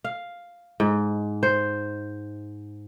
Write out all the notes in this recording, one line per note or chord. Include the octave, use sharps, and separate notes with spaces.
F5
G#2
C5